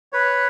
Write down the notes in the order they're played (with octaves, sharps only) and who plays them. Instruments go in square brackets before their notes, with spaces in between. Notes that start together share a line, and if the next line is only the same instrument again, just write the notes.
[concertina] B4 C#5